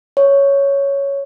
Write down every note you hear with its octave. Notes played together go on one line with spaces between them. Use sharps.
C#5